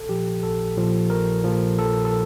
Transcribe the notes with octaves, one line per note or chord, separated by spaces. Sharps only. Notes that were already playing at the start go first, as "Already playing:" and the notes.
Already playing: A#1 A4
A#2 F3 G4
A#1 A4
A#2 F3
A#1 A#4
A#2 F3
A#1 A4
A4